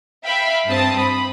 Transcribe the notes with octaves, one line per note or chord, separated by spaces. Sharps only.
E5 F5 G5 B5
G2 C4 A5 D#6
B5